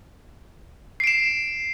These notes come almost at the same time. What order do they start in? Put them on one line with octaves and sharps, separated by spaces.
C7 D7 E7